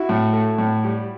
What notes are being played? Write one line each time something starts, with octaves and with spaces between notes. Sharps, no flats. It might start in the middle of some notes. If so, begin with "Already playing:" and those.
Already playing: E4 F#4
A2
A3
A2
G3